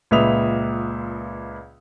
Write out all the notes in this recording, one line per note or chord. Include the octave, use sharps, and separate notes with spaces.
C#2 A#2 B4 E5 D#6 F7